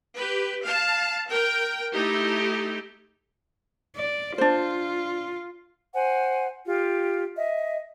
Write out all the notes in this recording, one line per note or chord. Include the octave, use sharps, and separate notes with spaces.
G4 B4
F5 A5
A#4 G5
A3 D#4 E4 G4
D5
D4 F4 C5
C5 F#5 G#5
F4 G4
D#5 E5